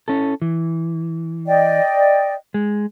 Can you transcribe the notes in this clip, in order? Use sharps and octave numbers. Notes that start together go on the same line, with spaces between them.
C#4 E4 A4
E3
D5 D#5 G5
G#3